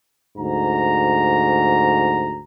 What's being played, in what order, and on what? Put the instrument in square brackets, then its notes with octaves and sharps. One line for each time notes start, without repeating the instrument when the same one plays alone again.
[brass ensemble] D2 G#2 A#5